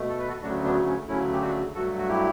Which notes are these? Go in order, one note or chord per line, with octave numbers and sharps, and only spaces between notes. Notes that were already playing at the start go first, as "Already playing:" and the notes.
Already playing: B2 A3
A4
B4
F#4 A4
D2 C#3 F#3 A3 D4 F#4
B3 D4
C#4
D2 C#3 F#3 A3 C#4 E4
G4
D4 F#4
G2 F#3 A3 F#4 A4
F#4
E4 G4